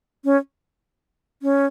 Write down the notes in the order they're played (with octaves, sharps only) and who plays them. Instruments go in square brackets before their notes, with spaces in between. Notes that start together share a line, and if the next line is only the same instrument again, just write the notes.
[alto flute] C#4
C#4